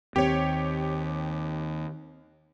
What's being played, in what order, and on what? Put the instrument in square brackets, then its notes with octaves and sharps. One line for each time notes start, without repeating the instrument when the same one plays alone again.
[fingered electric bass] D#2 [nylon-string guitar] C4 [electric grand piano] G4 C#5